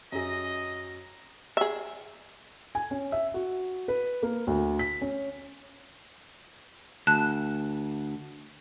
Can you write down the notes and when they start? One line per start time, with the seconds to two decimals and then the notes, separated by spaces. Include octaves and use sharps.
0.12 F#2 G#4 D#5
1.57 G#4 E5
2.75 G#5
2.91 C#4
3.12 E5
3.34 F#4
3.88 B4
4.23 A#3
4.47 D2
4.79 B6
5.01 C#4
7.07 D2 A5 F#6